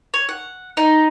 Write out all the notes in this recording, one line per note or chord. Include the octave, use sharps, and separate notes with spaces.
C#5
F#5
D#4